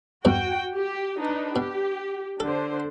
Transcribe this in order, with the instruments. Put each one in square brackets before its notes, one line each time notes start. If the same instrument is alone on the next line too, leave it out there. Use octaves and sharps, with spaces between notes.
[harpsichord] E2 G2 B2 [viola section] F#4 G5
[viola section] G4
D4 D#4 B4
[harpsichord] B2 [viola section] G4
[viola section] D3 D4 C5 [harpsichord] A4